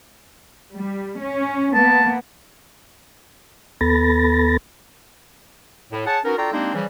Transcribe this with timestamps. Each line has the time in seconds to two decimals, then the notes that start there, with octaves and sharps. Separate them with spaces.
0.74 G3
1.21 C#4
1.74 A#3 B3 A5
3.81 D#2 B3 A4 B5 A6 A#6
5.92 A2
6.06 G#4 C#5 F#5 A5
6.24 B3 C#4 D#4 F#4 A#4
6.37 D4 F4 F#4 A4 G5 A#5
6.52 G3 G#3 A#3 C4 D4 D#4
6.74 C#3 E3 F3 G3